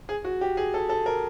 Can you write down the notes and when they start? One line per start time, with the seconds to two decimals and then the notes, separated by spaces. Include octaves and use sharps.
0.09 G#4
0.25 F#4
0.41 G4
0.57 G#4
0.74 A4
0.89 A4
1.06 A#4